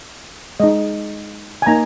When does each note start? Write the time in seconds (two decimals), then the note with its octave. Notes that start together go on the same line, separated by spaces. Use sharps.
0.60 G#3 D#4 D#5
1.62 G#5
1.66 A#3 D#4 A#5